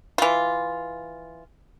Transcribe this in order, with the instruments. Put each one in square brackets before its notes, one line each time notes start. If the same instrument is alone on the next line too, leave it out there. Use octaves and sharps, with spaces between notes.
[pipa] E3 F4